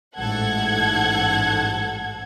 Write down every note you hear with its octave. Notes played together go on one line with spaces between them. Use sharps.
A1 G#2 A4 F#5 G#6